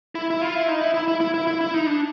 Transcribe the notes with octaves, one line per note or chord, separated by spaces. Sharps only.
E4
E4
F4
E4
D#4
E4
E4
E4
E4
E4
E4
E4
D#4
D4